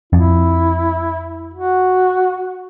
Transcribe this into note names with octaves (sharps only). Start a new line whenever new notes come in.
F2 E4
F#4